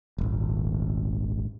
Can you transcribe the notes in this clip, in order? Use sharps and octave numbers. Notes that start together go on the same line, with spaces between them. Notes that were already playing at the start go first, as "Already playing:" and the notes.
D#1 G#1